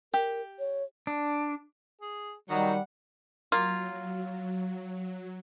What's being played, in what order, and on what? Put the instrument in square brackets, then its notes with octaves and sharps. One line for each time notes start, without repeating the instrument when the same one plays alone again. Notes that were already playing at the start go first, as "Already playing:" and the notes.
[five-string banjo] G4 [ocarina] A#4
[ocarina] C#5
[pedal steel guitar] D4
[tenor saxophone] G#4
[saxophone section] D#3 D#4 [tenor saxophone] F#3 [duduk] G3 [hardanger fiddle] F#5
[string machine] F#3 [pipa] A#3 F4